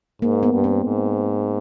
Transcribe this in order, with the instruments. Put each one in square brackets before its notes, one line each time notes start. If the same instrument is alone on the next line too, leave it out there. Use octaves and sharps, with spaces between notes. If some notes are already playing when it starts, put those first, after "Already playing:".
[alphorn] G#2 [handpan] A#3
[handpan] B3
[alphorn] G2
[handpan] C4
[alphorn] G#2